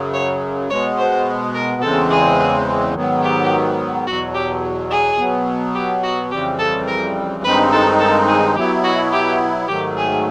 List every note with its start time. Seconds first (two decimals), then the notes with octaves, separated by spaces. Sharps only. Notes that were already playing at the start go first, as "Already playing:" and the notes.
Already playing: F#2 C#3 F#3
0.14 C#5
0.70 B2 G#3 B3 C#5
0.98 C5
1.55 A#4
1.82 E2 C#3 E3 G#3 C4 A4
2.10 G#4
2.94 G#2 D#3 F#3 B3
3.23 G4
4.07 E2 B2 F#3 F#4
4.34 G4
4.90 G#4
5.19 B2 F#3 B3
5.75 G4
6.03 F#4
6.31 F2 C#3 E3 G3 C4 G4
6.59 A4
6.88 A#4
7.44 G2 D#3 G#3 C4 D#4 B4
7.72 A4
8.00 A4
8.28 G#4
8.56 B2 F#3 B3 E4 G4
8.84 F#4
9.12 G4
9.68 G#2 D#3 F#3 A3 G4
9.97 G#4